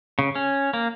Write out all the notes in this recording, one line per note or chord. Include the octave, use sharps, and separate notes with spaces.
C#3
C#4
A#3